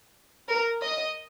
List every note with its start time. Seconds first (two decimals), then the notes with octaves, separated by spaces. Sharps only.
0.49 A#4
0.81 D#5